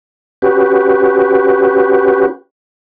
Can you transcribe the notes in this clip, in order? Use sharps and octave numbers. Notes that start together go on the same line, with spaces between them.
C#4 F#4 G4 B4